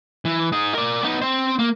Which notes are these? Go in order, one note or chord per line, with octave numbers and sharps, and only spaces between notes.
E3
D#4 G#4
A#4 D5
B3 D#4
C4 C5
A#3